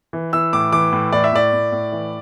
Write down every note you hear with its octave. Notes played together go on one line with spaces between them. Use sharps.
E3
E3 E6
A2 D6
E3 D6
A2
A2 D5
E5
A2 D5
A2
A2
E3